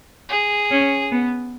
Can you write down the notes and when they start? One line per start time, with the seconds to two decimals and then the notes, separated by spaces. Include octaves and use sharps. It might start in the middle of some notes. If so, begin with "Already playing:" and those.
0.29 G#4
0.71 C#4
1.12 B3